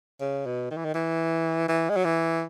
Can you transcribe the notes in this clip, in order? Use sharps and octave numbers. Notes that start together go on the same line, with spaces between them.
C#3
B2
D#3
E3
D#3
E3
E3
G#3
F#3
E3